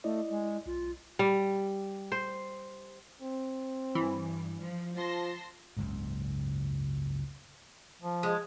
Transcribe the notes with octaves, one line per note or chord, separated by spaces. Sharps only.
A3 E4 D5 D#5
G#3
B1 F4
G3
C5
C4
G2 E3
F3
F3 A5 C6 A#6
F#1 C#2 G#2
F3
G#3